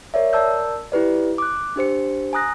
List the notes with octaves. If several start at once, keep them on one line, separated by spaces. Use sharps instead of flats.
A#4 C#5 D5 E5
A#4 D5 A5 E6 G6
E4 G4 B4 D5
D6 F#6
D4 G4 C5 C#7
G#5 A#5 D#6 F#6 A#6